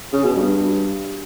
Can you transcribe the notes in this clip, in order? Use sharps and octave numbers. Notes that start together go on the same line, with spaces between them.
C#3
B2
G2